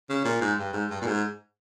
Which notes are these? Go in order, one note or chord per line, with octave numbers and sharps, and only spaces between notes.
C#3
A#2
G#2
G2
G#2
G2
A#2
G#2